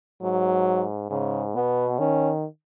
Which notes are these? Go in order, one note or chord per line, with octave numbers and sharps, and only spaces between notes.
G#2 F#3
G#2 C#3
B2 B3
D#3 C#4